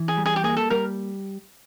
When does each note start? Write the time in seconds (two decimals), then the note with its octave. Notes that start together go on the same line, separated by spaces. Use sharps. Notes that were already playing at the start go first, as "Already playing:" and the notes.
Already playing: E3
0.08 G#4
0.18 G3
0.26 G#4
0.36 G4
0.44 A#3 G#4
0.57 A4
0.70 G3 A#4